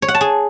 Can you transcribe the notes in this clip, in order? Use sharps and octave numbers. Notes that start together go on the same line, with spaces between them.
C#5
F#5
A5
G#4